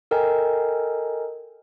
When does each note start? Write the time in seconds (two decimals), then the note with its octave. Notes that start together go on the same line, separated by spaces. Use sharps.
0.11 A4 A#4 D#5 G5 G#5